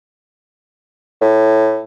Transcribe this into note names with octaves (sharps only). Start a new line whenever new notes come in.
A2